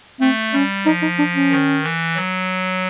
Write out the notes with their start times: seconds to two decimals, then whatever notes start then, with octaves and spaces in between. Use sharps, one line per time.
0.20 A3 C4
0.53 G3 C#4
0.86 F3 D#4
1.02 D#4
1.19 D4
1.35 C#4
1.51 D#3
1.83 E3
2.16 F#3